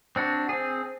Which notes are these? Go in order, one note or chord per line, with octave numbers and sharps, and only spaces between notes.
C4 D4 F#4
C4 G#4